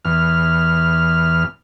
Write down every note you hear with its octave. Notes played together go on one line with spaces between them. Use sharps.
E2 F6